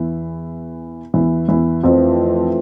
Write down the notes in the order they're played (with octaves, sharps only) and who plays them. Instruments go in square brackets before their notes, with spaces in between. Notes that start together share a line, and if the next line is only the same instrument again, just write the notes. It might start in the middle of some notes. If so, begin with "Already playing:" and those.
Already playing: [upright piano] E2 E3
E2 E3
E2 E3
[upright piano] F2 F3 [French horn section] E3 A3 C4 F4